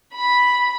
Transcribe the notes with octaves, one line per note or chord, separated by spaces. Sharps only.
B5